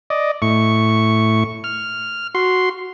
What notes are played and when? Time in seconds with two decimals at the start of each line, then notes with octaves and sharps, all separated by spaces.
0.10 D5 D#5
0.42 A2 C#6
1.64 F6
2.35 F#4 C6